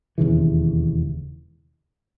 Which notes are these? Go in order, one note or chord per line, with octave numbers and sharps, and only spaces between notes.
E1 D#2 C#3 E3